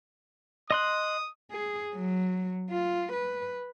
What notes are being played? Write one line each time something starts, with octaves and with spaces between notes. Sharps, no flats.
D#5 C6 D#6 F#6
G#4
F#3
F4
B4